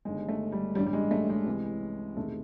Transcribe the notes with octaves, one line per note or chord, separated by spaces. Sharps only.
G1 G2 D#3 G#3
A3
G3
A1 G2 D3 G3
G3
G#3
A3
G#3
C2 C3 E3
E1 E2 C3 D#3 A3